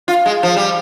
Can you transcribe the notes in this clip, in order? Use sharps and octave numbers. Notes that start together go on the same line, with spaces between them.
F4
G#3
F3
G3